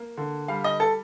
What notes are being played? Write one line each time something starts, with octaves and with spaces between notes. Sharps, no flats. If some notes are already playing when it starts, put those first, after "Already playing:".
Already playing: A#3
D3
G3 F5
D#5
A4